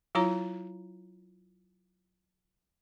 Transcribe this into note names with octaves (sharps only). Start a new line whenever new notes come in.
F#3 E4 F4 C#5 A#5